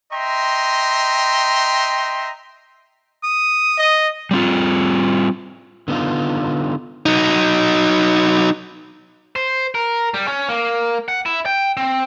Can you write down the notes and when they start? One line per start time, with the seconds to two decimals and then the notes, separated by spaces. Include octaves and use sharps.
0.12 D#5 E5 G5 A#5 C6
3.24 D#6
3.78 D#5
4.31 G3 C4 F4
5.88 D3 B3 D#4 F4
7.06 F#3 D#4
9.36 C5
9.75 A#4
10.14 G3
10.28 C#4
10.49 A#3
11.08 F#5
11.26 E4
11.46 G5
11.77 C4